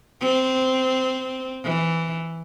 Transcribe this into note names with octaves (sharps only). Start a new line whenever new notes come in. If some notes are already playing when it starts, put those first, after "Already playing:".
C4
E3